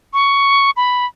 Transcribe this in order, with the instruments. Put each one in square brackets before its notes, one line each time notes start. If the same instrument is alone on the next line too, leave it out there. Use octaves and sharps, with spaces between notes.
[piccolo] C#6
B5